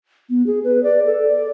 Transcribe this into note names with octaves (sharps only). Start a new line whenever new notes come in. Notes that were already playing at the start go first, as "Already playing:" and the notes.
B3
G#4
B4
D5
A4
D5